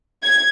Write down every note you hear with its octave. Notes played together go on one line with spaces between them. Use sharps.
G#6